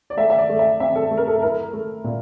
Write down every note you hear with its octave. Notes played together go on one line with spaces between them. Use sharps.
D5
A3 E5
E5
D5
A3
E5
C4 E5
A4
A3
A#4
A4
E4 A#4
A3
A#2